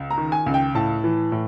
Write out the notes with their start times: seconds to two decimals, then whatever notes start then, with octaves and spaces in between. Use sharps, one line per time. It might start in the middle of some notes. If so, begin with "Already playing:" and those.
Already playing: C#2
0.11 A#5
0.18 D#3
0.32 G#5
0.46 C#2
0.54 G5
0.75 A2 A5
1.04 E3
1.32 A2